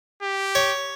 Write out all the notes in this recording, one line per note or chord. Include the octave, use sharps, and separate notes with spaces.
G4
C#5